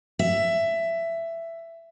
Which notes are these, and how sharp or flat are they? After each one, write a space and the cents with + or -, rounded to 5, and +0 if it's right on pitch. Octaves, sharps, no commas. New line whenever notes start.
E5 +15